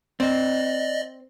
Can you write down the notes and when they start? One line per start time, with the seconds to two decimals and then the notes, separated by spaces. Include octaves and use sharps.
0.20 C4 D5 D#5